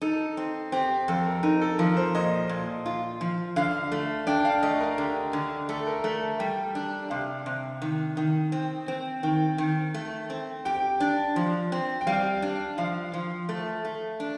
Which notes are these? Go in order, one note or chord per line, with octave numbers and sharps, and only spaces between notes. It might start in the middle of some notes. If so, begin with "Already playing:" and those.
D#4 A4
C4
C4 G4
G4
F2 A4
A#4
D#4 A#4
A4
F3 A#4
C5
A#2 D#5
A#2
F4
F3
D3 F5
A3
D4 G5
F5
A3 D#5
A#4
D3 G4
D3
A3 A4
A#4
A3
G3 G5
D4
C3 F5
C3
D#3
D#3
C4
C4
D#3 G5
D#3
A3
C4
G4 G5
D4
F3
C4
G5
G3 F5
D4
F3 F5
F3
A3
A3
D4